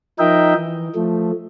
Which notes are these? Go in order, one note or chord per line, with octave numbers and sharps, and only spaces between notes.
F3 D#4 A#4 D#5 E5 G5
E3
F3 A3